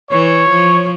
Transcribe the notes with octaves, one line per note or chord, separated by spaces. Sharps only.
E3 C#5
F3